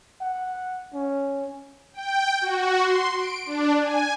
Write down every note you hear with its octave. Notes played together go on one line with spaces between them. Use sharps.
F#5
C#4
G5
F#4
C6
D7
D4
G#5